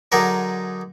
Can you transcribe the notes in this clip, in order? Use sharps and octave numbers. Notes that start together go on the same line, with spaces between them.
D3 F#3 D#4 G#4 A#4 D5